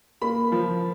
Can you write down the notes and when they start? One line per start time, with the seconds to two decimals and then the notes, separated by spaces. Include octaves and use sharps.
0.22 A#3 B5
0.52 F3